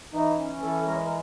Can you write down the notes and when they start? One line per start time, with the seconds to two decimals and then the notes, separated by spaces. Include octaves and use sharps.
0.13 E3 D#4
0.38 C#4
0.62 E3 A4
0.87 G#3 A#4
1.06 A#4